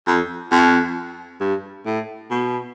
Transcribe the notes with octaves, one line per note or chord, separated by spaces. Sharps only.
F2
F2
G2
A2
B2